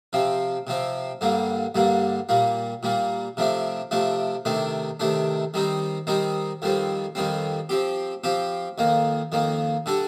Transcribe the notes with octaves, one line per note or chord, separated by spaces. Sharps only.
C3 F3 C4
C3 F3 C4
G2 D3 G3 A#3
G2 D3 G3 A#3
A#2 G3 A#3
A#2 G3 A#3
C3 F3 A3 D4
C3 F3 A3 D4
C3 D#3 A3 D4
C3 D#3 A3 D4
D#3 G3 C4 D#4
D#3 G3 C4 D#4
F2 D#3 G3 C4
F2 D#3 G3 C4
F3 C4 G4
F3 C4 G4
F2 D#3 A#3
F2 D#3 A#3
D3 G3 D4 A4